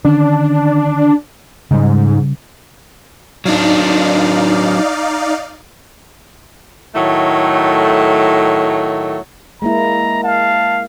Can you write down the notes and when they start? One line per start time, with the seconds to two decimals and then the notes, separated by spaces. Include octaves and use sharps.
0.05 D3 D#3 C#4 D4
1.71 G#2 C#3 G3
3.45 F#3 D4 D#4 D5 F5
6.95 A2 D#3 F#3 A3
9.62 G#3 A#3 E4 A#5
10.24 F5 A5